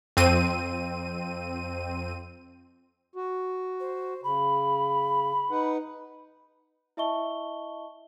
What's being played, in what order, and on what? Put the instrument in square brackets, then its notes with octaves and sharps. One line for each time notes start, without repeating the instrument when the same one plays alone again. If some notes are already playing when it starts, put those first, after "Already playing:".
[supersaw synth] F2 C4 D#7
[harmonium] F#4
[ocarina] C5
[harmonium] C#3 [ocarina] B5
[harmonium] D#4 B4 F#5
[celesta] E4 D#5 E5 A5 C#6 G7